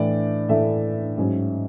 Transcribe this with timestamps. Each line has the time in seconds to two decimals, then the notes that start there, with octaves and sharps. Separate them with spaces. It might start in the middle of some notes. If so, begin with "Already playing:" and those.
Already playing: A2 E3 A3 D4 D5
0.49 A2 E3 A3 D4 E5
1.18 G#2 F#3 C#4